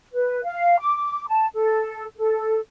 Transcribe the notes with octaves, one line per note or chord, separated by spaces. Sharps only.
B4
F5
D6
A5
A4
A4